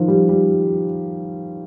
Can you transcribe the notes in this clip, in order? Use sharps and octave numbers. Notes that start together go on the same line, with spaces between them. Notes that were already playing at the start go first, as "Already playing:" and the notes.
Already playing: D#3 F3
G3
G3